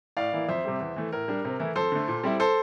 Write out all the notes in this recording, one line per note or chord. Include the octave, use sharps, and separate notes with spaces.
A2 D5 F5
E3 A#3 E4
F2 C5 E5
C3 G3
E2
E3 A3
A2 A#4
G3 D4
C3
E3 A3 E4
F2 A4 C5
D3 A3
A#2
G3 C4 E4
A4 C5